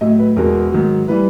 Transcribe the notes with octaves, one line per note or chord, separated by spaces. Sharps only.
A2 F#3 A3 D#5
B4
E2 B2 G#3 A#4
G#2 D#3 F#3
E3 G3 B4